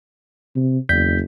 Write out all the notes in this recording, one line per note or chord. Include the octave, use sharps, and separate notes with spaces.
C3
F#1 E2 G6 B6